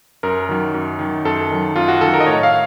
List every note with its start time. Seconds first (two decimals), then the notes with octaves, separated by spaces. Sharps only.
0.23 F#2 A#4
0.49 D#3 F#3
0.74 F#2
0.99 D#3 F#3
1.25 F#2 A4
1.50 D#3 F#3
1.76 F#2 F4
1.88 F#4
2.01 D#3 F#3 A4
2.14 A#4
2.20 D#5
2.26 A2 C#5
2.43 F5